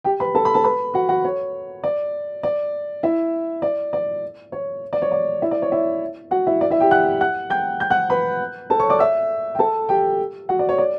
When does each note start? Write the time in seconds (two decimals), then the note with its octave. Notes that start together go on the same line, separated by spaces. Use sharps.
0.04 G4 G5
0.20 B4 B5
0.35 A4 A5
0.45 B5
0.54 A4 A5
0.64 B4 B5
0.94 F#4 F#5
1.09 F#4 F#5
1.25 C#5
1.84 D5
2.43 D5
3.03 E4 E5
3.62 D5
3.93 D5
4.52 C#5
4.93 D5
5.02 C#5
5.11 D5
5.42 E4 E5
5.51 D5
5.62 C#5
5.72 E4 E5
6.31 F#4 F#5
6.47 E4 E5
6.61 D5
6.70 E4 E5
6.80 G4 G5
6.91 F#5 F#6
7.21 F#5 F#6
7.50 G5 G6
7.80 G5 G6
7.90 F#5 F#6
8.10 B4 B5
8.70 A4 A5
8.79 C#5 C#6
8.90 D5 D6
8.99 E5 E6
9.55 G5
9.59 A4 A5
9.89 G4 G5
10.49 F#4 F#5
10.59 D5
10.69 C#5
10.78 D5